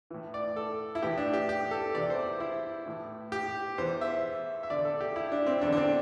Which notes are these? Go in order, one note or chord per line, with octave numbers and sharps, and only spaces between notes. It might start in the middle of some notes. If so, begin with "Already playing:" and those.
A2 E3
D5
A4
E4
A2 E3 G4
D4
G4
G4
A4
E2 C3 E3 D5
C5
E4
A2 E3
G4
E2 E3 C5
E5
E5
E2 D3 D5
A4
G4
E4
D4
C4
E2 D3 D4
D4
C4